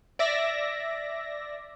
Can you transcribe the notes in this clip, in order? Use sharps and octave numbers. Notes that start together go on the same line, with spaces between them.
D5 E5 A#6